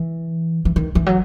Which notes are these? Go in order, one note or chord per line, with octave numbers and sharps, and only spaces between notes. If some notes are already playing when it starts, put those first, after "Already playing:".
Already playing: E3
E3
D#3
E3
F#3